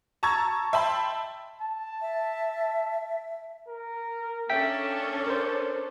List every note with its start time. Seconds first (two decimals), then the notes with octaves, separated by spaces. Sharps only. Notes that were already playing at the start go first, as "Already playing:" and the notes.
0.23 A5 A#5 C#6 E6 G#6 A6
0.73 E5 G5 A5 B5 C6
1.61 A5
2.01 E5
3.68 A#4
4.50 A#3 C#4 D4 A4 E5 G5 B6
5.27 A#4 C5 C#5